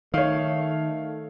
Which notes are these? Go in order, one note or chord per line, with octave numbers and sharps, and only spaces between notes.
D#3 A3 C#5 F5